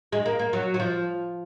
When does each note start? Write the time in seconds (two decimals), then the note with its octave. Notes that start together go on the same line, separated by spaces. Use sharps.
0.12 G#3
0.26 A#3
0.39 A#3
0.53 F#3
0.74 F#3
0.80 F3